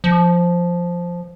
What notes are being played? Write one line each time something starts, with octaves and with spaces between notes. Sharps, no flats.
F3